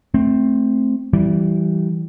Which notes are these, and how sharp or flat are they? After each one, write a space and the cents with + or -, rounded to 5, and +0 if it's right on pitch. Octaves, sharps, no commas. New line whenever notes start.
A3 -15 C4 +0
E3 +0 G3 -20